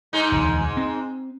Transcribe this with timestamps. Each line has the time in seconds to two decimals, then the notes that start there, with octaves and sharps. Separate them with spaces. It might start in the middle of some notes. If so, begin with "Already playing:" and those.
0.13 G#2 G#3 D#4
0.32 E1 D2
0.77 C4